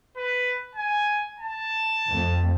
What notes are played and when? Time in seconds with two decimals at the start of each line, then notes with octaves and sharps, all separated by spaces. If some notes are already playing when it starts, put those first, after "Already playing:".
0.17 B4
0.75 G#5
1.40 A5
2.09 F2 A3